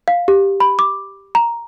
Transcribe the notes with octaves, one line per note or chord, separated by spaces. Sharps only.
F5
G4
B5
D6
A#5